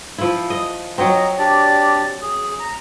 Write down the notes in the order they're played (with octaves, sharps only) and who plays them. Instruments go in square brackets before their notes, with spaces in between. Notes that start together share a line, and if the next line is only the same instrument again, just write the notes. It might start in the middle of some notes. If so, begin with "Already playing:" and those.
[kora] F3 E4
D#5
[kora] F#3 C4 [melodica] D#5 A#5
[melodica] D4 G4 D5
G#4
A#5